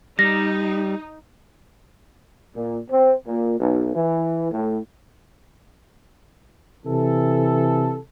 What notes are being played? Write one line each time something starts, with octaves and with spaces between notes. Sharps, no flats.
G3 D#4 A#6
A#2
C4
A#2
B1
E3
A2
C3 E3 A4